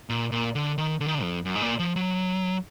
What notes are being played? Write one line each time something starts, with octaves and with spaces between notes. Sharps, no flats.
A#2
A#2
D3
D#3
D3
D#3
D3
F2
F#2
G#2
A#2
F3
F#3